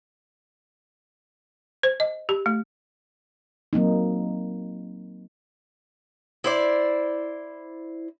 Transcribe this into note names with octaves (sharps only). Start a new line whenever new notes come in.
C5
D#5
G4
A3
F#3 A#3 C4 D#4
E4 C5 D5